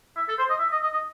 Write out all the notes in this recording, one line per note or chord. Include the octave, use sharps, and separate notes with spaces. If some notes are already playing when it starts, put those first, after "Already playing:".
E5
A4
C5
D#5
E5
D#5
D#5
D#5